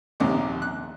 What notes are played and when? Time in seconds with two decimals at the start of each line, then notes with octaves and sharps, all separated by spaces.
0.20 A#1 D#2 C3 D#3 D6
0.62 F#6